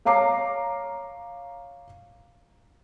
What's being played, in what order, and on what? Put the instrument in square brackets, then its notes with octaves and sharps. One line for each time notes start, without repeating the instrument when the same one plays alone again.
[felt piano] C#5 F5 A#5 D6 C7